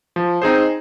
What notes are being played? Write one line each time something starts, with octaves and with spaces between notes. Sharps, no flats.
F3
C4 D#4 G#4 C5